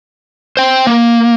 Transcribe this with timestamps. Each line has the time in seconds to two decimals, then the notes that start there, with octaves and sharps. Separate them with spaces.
0.57 C5 G5
0.87 A#3